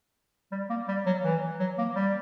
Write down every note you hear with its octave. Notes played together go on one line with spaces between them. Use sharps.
G3
A#3
G3
F#3
E3
F#3
A#3
G3